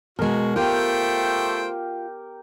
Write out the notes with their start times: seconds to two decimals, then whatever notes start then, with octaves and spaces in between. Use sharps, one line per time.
0.19 B2 G#3 F#4 A#4
0.56 A3 F4 G4 A#4 C5 G5